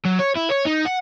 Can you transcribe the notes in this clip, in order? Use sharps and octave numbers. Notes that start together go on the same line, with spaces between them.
F#3
C#5
E4
C#5
D#4
F#5